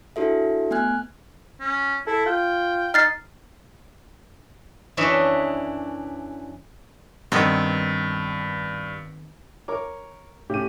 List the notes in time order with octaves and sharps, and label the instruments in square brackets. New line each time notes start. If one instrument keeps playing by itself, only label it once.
[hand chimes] D4 E4 F#4 A4 E5
A3 B3 G#5 F6 F#6 G#6
[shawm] C#4
[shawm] E4 [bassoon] A4
[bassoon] F4 [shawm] G5
[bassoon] D#4 [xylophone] F6 A6 C7
[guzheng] F#2 E3 D4 C#5 D#5 E5
[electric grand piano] G2 [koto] D#3 B3 C4
[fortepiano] A#4 C#5 D6
[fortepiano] A2 C#3 [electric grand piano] G4 D#7